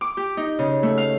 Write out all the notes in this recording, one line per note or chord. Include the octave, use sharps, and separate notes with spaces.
D6
G4
D#4
C#3
A3
F5